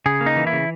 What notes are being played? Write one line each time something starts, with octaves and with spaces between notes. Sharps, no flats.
C#3 G#4
A#3
D#4
E3
E4
C#3